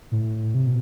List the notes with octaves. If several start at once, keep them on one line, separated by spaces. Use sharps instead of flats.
A2
C3
B2